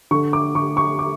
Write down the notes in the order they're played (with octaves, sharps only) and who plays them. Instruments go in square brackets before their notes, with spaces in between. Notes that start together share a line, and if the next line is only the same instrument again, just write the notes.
[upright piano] D3 C#6
D6
D3 C#6
C#6
D6